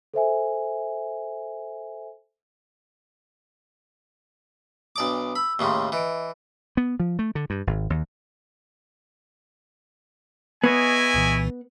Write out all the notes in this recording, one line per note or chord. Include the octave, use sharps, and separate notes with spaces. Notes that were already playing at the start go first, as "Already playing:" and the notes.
A4 C5 E5 G#5
B1 D4 D5 A5 D6 D#6
B5 E6
D#2 A2 C#3 C6 C#6
E3 D#5 E5 D7
B3
F3
A3
D3
G2
G#1
D#2
B3 E4 G#4 C#5 D#5 G#5
C2 A#2 E3